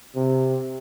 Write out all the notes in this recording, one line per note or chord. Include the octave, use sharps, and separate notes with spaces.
C3